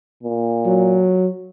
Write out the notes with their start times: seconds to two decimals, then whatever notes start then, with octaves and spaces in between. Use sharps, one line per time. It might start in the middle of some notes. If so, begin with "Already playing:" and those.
0.23 A#2
0.65 F#3